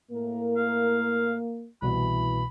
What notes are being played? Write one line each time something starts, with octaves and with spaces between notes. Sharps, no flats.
A2 A#3 A#4
F5
C2 B2 E3 B5